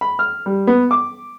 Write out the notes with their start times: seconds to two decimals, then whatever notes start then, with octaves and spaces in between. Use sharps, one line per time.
0.01 B5
0.19 F6
0.46 G3
0.67 B3
0.91 D6